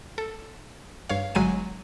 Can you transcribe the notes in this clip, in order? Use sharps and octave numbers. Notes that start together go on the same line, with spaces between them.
A4
G2 C#5 F5
G1 F#3 G#3 G#5 D#7